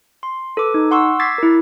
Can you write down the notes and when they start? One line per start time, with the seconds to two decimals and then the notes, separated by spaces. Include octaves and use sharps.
0.23 C6
0.57 A4 B4 D6
0.74 D#4
0.91 F#5 C6 C#6 E6
1.19 D6 E6 G#6 A6 B6 C7
1.38 E4 A#4